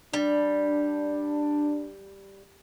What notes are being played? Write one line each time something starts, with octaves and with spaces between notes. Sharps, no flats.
G3 D4